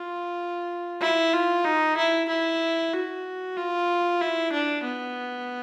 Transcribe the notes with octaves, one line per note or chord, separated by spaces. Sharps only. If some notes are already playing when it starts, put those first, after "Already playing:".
Already playing: F4
E4
F4
D#4
E4
E4
F#4
F4
E4
D4
B3